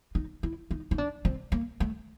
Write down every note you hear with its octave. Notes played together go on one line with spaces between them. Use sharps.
D#4
E4
D#4
D#4
D4
C4
A#3
A3